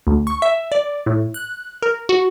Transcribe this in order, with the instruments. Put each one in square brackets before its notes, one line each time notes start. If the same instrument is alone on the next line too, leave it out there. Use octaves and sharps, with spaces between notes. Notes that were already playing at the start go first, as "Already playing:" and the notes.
[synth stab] D2
C#6
E5
D5
A2
F#6
A#4
F#4